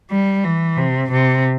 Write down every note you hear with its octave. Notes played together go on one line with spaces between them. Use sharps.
G3
E3
C3
C3